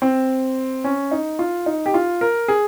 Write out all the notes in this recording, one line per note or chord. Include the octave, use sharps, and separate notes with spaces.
C4
C#4
D#4
F4
D#4
G4
F4
A#4
G#4